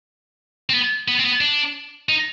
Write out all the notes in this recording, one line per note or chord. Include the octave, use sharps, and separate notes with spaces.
C4
B3
B3
C4
B3
D4
D#4